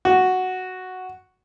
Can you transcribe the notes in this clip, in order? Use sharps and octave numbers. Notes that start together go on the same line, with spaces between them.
F#4